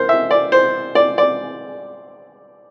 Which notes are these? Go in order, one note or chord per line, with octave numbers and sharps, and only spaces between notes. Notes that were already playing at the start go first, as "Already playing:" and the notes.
Already playing: A#4 C5
E5
D5
C5
D5
D5